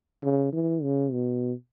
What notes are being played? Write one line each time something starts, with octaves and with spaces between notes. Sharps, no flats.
C#3
E3
C#3
B2